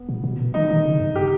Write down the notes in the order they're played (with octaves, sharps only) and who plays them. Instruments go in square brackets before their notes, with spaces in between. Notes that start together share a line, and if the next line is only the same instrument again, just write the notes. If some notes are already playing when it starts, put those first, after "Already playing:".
Already playing: [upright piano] B3
[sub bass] A#2
B2
[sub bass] D#3 [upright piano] D#4
[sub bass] D#3
C#3
G2
[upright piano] G4